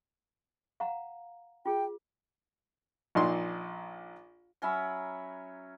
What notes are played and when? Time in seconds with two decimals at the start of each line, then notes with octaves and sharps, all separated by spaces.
0.80 F5 F#5 A#5
1.66 F4 G#4 G5
3.15 A#1 A#2 D#4 C6
4.62 F#3 C#4 E5 B5